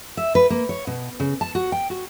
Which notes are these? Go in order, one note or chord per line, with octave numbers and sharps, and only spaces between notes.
E5
B4
A#3
C#5
B2
C#3
A5
F#4
G5
F#4